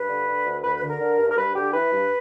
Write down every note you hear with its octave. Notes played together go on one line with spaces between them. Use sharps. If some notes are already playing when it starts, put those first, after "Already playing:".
Already playing: G2 B4
D3
D3
D2
D2 B4
B4
D3
A#4
D3
G2
A#4
G2 B4
D3 G4
E3 B4
G2